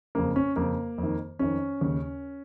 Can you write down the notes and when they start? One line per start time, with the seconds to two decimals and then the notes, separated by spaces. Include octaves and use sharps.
0.15 F2 C#3 A#3
0.36 C#4
0.56 F2 C#3 A#3
0.98 F2
1.03 D#3
1.39 F2 D#3 C#4
1.81 D#2 C#3